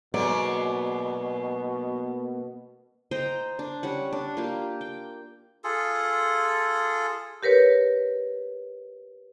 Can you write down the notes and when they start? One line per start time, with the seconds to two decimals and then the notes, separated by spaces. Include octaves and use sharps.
0.14 G#2 B2 F#3 A#3 B3 D5
3.11 C5 D#5 G5 A#5
3.59 D4
3.83 G3 C#4 F#5
4.12 D4
4.37 A#3 F4 G4
4.81 G5
5.64 F4 G#4 A4
7.43 G4 A#4 B4 C#5